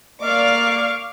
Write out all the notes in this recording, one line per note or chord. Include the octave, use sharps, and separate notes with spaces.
A#3 D5 F5 C#6 D6